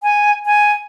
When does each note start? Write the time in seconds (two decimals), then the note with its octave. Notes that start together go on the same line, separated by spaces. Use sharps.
0.03 G#5
0.46 G#5